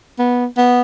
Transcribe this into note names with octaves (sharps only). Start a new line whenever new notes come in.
B3
B3